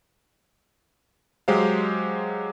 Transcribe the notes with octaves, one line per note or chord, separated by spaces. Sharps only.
F#3 G#3 G4 C5 F5